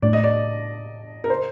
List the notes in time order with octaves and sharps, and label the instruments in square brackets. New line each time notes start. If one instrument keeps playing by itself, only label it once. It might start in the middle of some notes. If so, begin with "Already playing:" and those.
[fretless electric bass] A2 A3 D4 [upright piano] D5
[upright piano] D#5
D5
A#4
C5